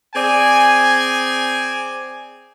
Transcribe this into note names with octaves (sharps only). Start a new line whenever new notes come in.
C4 G#4 D5 G#5